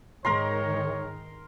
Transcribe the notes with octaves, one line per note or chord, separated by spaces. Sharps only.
G#2 D#3 G#3 A#4 C#5 A#5 C6